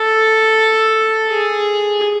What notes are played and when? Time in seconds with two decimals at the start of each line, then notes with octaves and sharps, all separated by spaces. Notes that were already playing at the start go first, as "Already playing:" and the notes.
Already playing: A4
1.30 G#4